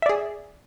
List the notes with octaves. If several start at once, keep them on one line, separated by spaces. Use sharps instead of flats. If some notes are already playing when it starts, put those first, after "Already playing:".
G#4 D5 E5